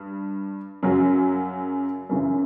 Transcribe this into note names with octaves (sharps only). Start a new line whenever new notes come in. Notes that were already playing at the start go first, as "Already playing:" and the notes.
Already playing: G2
F#2 C#3 F#3
F#2 C#3 E3